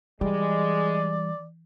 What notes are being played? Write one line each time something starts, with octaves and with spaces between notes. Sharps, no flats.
E3 G3 G#3 D5 D6